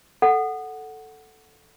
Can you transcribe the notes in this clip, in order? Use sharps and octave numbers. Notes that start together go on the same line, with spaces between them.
A4 F#5